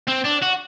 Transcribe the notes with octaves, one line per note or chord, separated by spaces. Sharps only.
C4
D4
F#4